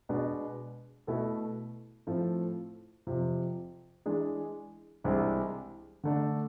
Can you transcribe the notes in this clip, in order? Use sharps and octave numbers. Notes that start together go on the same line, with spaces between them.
B2 G#3 B3 D4
B2 A3 E4 A4
A2 F3 A3 C4
F2 C3 F3
E3 G#3 D4 G#4
C2 C3 E3 G#3 D4
D3 A3 D4